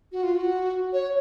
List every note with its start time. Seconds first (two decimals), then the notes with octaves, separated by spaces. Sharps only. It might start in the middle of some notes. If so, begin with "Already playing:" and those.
0.12 F#4
0.23 F4
0.35 F#4
0.93 C#5